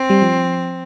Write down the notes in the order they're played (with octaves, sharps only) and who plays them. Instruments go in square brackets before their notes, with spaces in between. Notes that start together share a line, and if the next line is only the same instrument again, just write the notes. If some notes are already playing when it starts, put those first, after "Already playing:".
Already playing: [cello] C4
[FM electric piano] G3
F3